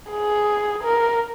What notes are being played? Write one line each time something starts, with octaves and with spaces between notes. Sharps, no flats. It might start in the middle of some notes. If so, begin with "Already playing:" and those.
G#4
A#4